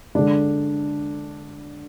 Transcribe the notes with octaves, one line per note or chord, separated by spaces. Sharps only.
D3 G#3 D4